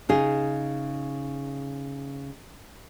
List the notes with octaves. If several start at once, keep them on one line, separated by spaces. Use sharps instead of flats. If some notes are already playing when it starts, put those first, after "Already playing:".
C#3 D#4 G#4